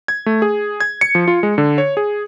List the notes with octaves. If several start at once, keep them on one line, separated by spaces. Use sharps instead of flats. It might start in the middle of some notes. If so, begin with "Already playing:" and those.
G#6
A3
G#4
G#6
C#7
F3
F4
G#3
D3
C#5
G#4